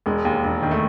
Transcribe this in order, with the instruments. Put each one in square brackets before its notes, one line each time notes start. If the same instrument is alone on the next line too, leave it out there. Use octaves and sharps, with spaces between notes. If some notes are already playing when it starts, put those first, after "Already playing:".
[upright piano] E1 [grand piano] G#3
[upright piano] D#2
E1
D#3
[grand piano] A3